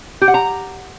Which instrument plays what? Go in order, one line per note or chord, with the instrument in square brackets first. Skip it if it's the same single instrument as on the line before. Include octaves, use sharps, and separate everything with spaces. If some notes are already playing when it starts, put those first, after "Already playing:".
[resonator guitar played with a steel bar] G4
F#5
A#5